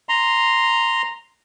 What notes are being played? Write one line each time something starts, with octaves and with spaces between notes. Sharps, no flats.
A#5 C6